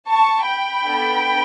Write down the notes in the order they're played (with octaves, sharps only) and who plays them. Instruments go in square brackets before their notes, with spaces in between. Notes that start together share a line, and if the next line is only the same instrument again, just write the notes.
[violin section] A5 C#6
G5 B5
B3 D4 A4